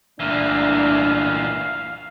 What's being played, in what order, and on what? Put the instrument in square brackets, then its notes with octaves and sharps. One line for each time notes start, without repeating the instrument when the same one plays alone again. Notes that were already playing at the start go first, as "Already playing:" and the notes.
[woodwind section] C2 A3 [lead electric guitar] A#2 E3 [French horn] D4 [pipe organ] F5